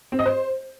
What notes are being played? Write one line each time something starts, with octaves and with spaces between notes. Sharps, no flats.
C4
D#5
C5